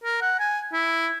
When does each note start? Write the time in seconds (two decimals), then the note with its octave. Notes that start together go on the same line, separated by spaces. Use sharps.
0.04 A#4
0.22 F#5
0.39 G#5
0.73 E4